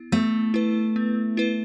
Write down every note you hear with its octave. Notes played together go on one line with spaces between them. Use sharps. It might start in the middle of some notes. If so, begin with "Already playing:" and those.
Already playing: B3 E4
A3 B3
E4 B4
B3
E4 B4